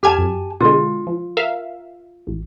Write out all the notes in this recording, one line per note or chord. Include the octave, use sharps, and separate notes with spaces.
F2 G4 G#5 A5 F6 G#6
F#2
B2 D3 G#3 F4
F3
A#4 E5 F5
A1